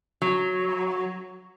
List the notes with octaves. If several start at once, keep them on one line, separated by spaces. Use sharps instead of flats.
F#3